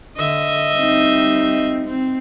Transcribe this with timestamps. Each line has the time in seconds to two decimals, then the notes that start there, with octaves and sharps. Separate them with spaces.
0.17 D3 D#5 E5
0.74 G3 C4 D#4
1.86 C4